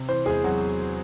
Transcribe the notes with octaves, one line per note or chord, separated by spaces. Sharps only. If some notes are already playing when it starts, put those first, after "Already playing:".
Already playing: C3
E3 C4 C5
E2 G#3 G#4
C3 F#3 F#4